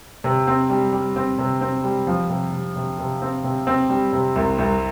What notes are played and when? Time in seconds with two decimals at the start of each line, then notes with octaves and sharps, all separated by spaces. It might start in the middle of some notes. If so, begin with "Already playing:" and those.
0.24 C3
0.47 C4
0.70 G3
0.93 G3
1.16 C4
1.38 C3
1.61 C4
1.84 G3
2.07 F3
2.30 C3
2.53 C3
2.76 C3
2.99 C3
3.22 C4
3.44 C3
3.67 C4
3.90 G3
4.13 C3
4.36 C2
4.58 C2